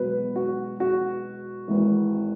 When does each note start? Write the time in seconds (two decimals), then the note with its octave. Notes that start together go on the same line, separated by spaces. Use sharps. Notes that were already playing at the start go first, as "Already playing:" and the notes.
Already playing: E1 E2 B2 F#3 B4
0.36 F#4
0.80 F#4
1.68 G#1 G#2 E3